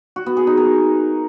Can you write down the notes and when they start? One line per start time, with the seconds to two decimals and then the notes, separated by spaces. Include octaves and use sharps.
0.16 F#4
0.26 B3
0.37 G#4
0.47 D#4
0.57 A#4